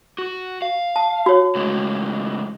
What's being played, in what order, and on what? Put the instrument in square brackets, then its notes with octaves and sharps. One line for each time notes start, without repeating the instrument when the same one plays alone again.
[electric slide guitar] F#4
F5
[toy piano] A5
F#4 C#5
[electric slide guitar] A2 C#3 G#3